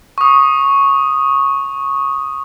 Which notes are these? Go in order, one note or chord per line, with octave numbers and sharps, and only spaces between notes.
C#6 D#6